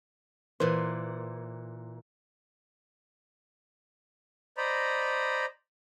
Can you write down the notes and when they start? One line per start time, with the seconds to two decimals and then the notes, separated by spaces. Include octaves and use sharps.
0.60 A#2 E3 B4 C5
4.57 C5 D5 D#5 A#5 B5